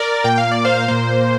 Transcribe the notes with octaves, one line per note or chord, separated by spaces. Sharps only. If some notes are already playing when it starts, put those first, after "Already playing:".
Already playing: A#4 D5
A#2 A#3 G5
F5
D5
C5 F5
A#2 A#3 C5